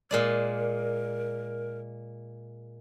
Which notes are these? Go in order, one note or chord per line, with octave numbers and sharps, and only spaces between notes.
A#2 G#3 A#4 D5